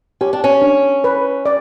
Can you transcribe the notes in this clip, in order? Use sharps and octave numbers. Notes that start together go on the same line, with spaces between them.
C#4 G4
D4
C#4
D4
B4
D5